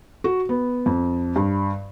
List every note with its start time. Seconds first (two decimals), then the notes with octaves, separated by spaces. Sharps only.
0.24 F#4
0.49 B3
0.86 F2
1.36 G2